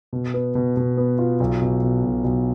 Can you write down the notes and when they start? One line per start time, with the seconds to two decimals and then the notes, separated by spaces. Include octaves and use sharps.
0.13 B2
0.34 B3
0.55 B2
0.77 B2
0.97 B3
1.19 F4
1.40 B1
1.62 B2
1.83 B2
2.04 B1
2.24 B1